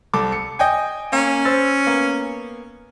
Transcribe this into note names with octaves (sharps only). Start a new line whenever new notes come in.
C2 A4 D6
C#7
D#5 G5 G#5
A#3 C#4
C5 E6 A6
A#3 B3